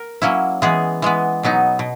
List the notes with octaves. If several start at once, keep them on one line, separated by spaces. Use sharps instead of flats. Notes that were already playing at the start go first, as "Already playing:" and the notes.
Already playing: A#4
F#3 A#3 C#4 E4
E3 G#3 B3 G#4
E3 G#3 B3
B2 F#3 B3 D#4
B2